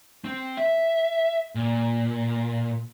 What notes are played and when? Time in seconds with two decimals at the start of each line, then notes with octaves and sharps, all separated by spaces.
0.24 C4
0.57 E5
1.55 A#2